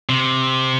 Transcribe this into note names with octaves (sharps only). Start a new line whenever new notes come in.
C3